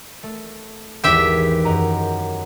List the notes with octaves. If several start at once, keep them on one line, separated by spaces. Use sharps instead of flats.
A3
G#1 E2 E3 G4 E5 G5
F#2 D#5 A#5